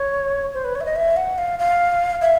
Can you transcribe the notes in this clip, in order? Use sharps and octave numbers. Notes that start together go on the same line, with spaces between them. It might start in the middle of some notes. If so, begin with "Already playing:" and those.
Already playing: C#5
C5
B4
C#5
E5
D#5
E5
F#5
F5
F5
E5